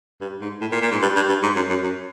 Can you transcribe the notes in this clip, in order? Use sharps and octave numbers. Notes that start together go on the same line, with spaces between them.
G2
G#2
A2
A#2
A#2
G#2
G2
G2
G2
G#2
F#2
F#2
F#2